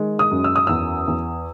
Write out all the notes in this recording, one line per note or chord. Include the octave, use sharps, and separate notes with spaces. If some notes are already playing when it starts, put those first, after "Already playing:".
Already playing: D#3 G#3
D#6
F#2
E6
D#6
E2 E6
E2